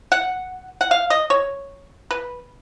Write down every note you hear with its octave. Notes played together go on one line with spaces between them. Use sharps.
F#5
F#5
F5
D#5
C#5
B4